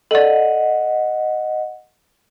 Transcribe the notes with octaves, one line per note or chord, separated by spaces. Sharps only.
A4 D5 D#5 F#5